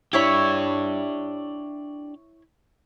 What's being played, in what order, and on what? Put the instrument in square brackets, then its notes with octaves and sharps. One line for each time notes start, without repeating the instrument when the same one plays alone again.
[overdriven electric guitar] D4 G4 [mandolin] E4 C#5 B5